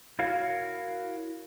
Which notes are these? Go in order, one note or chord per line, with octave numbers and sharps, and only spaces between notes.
E4 F#4 A#4 C#5 F5